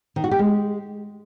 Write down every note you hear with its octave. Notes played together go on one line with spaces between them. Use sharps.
D#3
F#4
G4
G#3